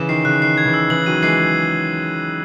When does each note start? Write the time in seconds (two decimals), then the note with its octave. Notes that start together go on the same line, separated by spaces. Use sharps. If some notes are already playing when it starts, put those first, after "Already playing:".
Already playing: C#3 E3 E7
0.09 D#3 C7
0.25 C#3 F#6
0.42 D#3 C7
0.58 G#6
0.66 C#3 E3
0.74 E6
0.90 C#3 E3 F#7
1.06 D#3 F#3 D#7
1.22 E3 G#3 C7